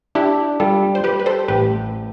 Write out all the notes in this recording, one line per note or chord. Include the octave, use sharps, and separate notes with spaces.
D4 E4 G4
G3 F4 A4
C5
G3 G4 B4
B4
A4 C5
A1 G4 B4